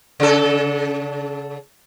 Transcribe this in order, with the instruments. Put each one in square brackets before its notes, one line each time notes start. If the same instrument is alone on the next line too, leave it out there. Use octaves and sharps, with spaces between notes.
[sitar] C#3 A4